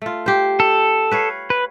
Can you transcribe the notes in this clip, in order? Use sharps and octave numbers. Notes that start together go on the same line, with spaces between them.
A3 F4
G4 C5
A4
B4 C#5 F5
B4